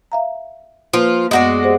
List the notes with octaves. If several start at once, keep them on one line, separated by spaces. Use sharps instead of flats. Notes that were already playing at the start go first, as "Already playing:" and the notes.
E5 F5 A#5
F3 A#3 F4 B4
F#2 G#3 B3 F#4 D5
G4 G#4 C5